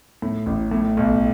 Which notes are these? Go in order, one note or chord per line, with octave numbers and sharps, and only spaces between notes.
A2
A1
A2
B1